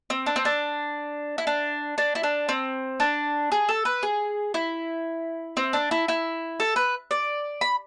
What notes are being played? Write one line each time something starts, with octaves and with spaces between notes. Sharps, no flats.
C4
D4
C4
D4
E4
D4
D4
E4
D4
C4
D4
G#4
A4
B4
G#4
E4
C4
D4
E4
E4
A4
B4
D5
B5